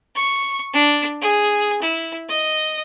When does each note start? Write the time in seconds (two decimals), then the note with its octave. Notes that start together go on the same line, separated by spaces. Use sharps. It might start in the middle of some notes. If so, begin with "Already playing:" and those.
0.15 C#6
0.73 D4
1.21 G#4
1.82 E4
2.29 D#5